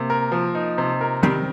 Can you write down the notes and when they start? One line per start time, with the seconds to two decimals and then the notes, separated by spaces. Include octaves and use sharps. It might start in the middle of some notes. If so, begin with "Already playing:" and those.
Already playing: C3 A#3
0.10 A#4
0.32 F3
0.55 D#4
0.78 C3
1.01 A#4
1.23 D#3 G3 C4